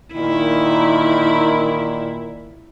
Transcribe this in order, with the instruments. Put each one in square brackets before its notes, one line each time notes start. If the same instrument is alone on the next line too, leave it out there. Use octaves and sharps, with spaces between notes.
[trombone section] A#2 D#3 [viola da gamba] E4